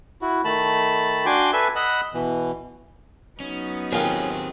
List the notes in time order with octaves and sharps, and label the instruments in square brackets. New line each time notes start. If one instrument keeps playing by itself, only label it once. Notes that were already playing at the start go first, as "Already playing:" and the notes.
[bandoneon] E4 F#4
D#3 A3 A5 B5
D4 F#4 G5 G#5 C6 D6
A4 B4 E5 G#5 E6
D#5 F#5 B5 E6
B2 E3
[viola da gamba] F#3 B3 D#4 [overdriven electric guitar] C#4
[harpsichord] D#2 F4 A#4 [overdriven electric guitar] C4 G#4 [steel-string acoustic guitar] C#4